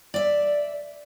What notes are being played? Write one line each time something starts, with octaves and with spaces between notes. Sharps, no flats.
D5 E5